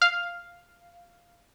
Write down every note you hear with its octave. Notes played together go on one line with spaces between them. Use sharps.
F5